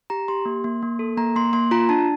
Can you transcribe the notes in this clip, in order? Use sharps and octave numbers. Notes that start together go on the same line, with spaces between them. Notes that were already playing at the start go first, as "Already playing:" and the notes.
G4 A#5
G4 C6
A#3
A#3
A#3
A4
A#3 A#5
A#3 C6
A#3 C6
F4 A#5
D4 A5